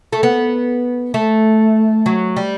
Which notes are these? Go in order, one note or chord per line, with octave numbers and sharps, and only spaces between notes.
A3
B3
A3
F#3
G3